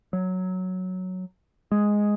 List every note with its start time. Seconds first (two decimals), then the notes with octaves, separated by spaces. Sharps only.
0.13 F#3
1.72 G#3